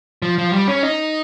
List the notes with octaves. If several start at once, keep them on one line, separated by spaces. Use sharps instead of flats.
F3
F3
G3
C#4
D#4